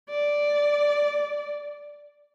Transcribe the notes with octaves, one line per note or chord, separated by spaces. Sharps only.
D5